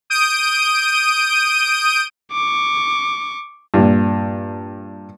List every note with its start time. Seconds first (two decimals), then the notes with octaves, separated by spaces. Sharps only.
0.10 D#6 G6 D7 D#7
2.32 C#6 D6
3.74 G2 A#2